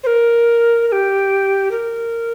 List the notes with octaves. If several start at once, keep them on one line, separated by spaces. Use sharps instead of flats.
C5
A#4
A#4
G4
A#4